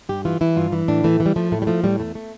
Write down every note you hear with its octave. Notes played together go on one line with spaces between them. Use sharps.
G2 G4
E3 F4
E3 E4
G2 F4
E3
A2 D4
E3 A3
E3
G3
F3 A3
A2 A3
G3
F3 A3
A2 G3
E2 A3
A3